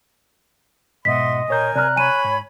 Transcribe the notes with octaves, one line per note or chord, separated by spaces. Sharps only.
G#2 B2 D#5 E5 F#5 C6 B6
A#2 A#4 C#5 G#5 G6
C3 D5 A#5 F6 F#6
C#5 G#5 B5 C#6 D#7
G#2